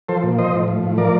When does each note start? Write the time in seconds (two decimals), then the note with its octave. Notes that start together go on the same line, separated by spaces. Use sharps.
0.09 F3 A4 C5
0.23 A#2
0.38 F3 C5 D#5
0.53 A2
0.68 F3
0.83 A2
0.97 F3 A#4 D5